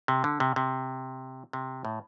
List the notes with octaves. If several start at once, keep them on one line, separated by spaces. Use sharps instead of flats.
C3
D3
C3
C3
C3
A2